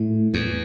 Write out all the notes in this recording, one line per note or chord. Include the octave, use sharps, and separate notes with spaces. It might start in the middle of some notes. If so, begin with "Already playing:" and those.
Already playing: A2
E2